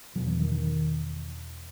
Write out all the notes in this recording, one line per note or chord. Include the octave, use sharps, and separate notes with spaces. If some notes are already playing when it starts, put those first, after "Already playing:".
E2 B2 F#3
E3
D#3
D#3